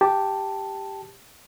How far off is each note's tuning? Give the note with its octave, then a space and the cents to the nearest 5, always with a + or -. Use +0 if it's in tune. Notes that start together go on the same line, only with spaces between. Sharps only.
G4 +0 A5 +0